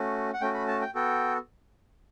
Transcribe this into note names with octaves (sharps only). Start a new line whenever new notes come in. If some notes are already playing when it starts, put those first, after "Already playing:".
Already playing: A3 C#4 F#4
F#5
A3 C#4 F#4 G5
B5
A5
G5
B3 F#4 A4 G5